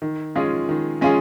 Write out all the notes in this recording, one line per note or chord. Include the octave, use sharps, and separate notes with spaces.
D#3
G#3 C#4 F4 G#4
D#3
G#3 C#4 F4 G#4